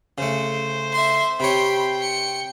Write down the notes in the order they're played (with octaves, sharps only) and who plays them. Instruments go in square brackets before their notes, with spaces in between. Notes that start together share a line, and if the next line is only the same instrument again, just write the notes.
[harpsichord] C#3 A3 [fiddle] C5
[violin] E5 C6
[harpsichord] C3 C#5 [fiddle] G5 [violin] B5 C6
[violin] C#7